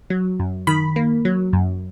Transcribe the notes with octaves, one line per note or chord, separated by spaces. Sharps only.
F#3
F#2
D#3 B5
A#3
F#3
F#2